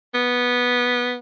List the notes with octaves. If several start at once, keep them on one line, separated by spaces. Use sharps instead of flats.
B3